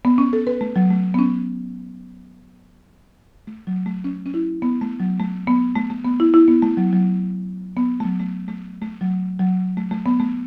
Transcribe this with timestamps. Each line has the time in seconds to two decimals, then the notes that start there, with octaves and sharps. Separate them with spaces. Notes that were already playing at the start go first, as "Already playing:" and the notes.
0.05 B3
0.18 C#4
0.33 A4
0.47 B4
0.61 A3
0.76 F#3
0.90 A3
1.14 B3
1.19 C#4
3.47 A3
3.67 F#3
3.86 A3
4.04 C#4
4.26 C#4
4.34 E4
4.62 B3
4.81 A3
5.00 F#3
5.20 A3
5.47 B3
5.76 A3
5.90 A3
6.05 B3
6.20 E4
6.34 E4
6.48 B3
6.62 A3
6.77 F#3
6.93 F#3
7.77 B3
8.00 A3
8.05 F#3
8.20 A3
8.48 A3
8.81 A3
9.01 F#3
9.39 F#3
9.77 A3
9.91 A3
10.06 B3
10.20 A3